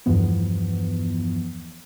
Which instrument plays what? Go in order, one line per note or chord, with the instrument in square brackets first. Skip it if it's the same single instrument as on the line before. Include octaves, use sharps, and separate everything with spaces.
[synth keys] E2 G2 E3 F3 B3